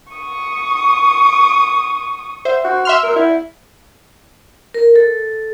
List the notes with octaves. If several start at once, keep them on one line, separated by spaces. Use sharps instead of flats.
C#6 D#6
C5 E5
F#4
E5 C6 F6
A#4
E4
A#4
A4